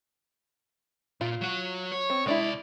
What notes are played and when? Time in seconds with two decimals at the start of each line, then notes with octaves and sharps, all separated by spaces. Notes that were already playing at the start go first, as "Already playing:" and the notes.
1.21 A#2 F4
1.41 F#3 F#4
1.92 C#5
2.10 C4
2.26 C2 G#3 D4 E4 D5